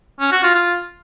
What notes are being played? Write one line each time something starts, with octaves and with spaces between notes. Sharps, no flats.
C#4
F#4
F4
F4